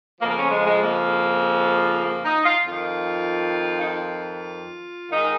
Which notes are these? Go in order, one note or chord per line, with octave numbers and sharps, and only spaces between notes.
F2 C#3 F3 A#3
A#3
C#4
G#3
G#3
A#3
A#3
D#4
F4
F2 D#3 F4
D#4
F4
G#2 D#3 D#4